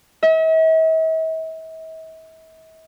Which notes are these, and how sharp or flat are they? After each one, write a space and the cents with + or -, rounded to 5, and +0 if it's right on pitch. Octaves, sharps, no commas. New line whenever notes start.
E5 -45